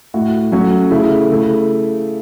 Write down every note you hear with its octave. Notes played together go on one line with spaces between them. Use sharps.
A2 A3 F#4
F#3 A3 C#4 F#4
C#3 A3 E4
C#3 A3 E4